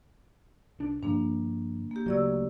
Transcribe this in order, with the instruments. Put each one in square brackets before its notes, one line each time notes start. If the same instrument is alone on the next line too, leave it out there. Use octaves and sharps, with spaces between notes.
[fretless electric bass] C2 D4
[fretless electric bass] G2 D3 F3 [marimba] A#3 D4
[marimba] A#3 G4
[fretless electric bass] D2 F#3 A3 [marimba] C#3 D5 E6